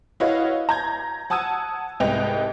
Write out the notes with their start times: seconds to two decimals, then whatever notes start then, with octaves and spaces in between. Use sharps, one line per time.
0.20 E4 F#4 B4 C#5 D#5 F5
0.69 A#5 G6 G#6
1.30 F#5 A5 D#6 E6 G#6 D#7
2.00 C2 G#2 B4 D#5 G5 F7